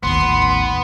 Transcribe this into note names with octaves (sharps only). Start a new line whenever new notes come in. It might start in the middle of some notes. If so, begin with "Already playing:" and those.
A1 D#2 B3 C6